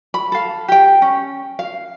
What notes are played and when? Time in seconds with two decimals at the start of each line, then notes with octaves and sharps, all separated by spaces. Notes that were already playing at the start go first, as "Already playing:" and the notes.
0.14 B5
0.32 A4 F5
0.68 G4 G5
1.02 C#4
1.59 F5